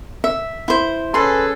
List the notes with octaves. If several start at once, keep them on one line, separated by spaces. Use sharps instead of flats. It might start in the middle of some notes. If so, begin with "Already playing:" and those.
E5
E4 C5
C#4 G#4 A4 B4 C6